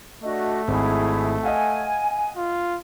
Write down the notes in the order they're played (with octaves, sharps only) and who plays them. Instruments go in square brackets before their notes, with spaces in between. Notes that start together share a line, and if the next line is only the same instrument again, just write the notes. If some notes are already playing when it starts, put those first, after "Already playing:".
[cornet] A3 [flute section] D4 F#4 D#5
[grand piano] G#1 [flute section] E4 G#4
[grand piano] D#5 F5 F#5 [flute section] G#5
[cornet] F4